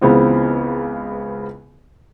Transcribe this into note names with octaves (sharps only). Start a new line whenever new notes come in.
C#2 C#3 E3 B3 C4 F4